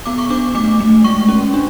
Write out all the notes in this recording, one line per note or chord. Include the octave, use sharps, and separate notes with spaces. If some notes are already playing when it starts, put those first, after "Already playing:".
B3 D6
C#6
D4 D6
A3 D6
A3
G#3 C#6
C#4
D4